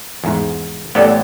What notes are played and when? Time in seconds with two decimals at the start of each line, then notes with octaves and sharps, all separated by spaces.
0.24 E2 G#2
0.95 A1 B3 G4 A4 D5